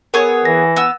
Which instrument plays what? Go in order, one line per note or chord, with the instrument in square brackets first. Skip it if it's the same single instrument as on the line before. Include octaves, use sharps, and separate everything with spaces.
[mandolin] B3 G#4 C#5 [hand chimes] A#4
[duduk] E3 [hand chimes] A#6
[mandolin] B3 E6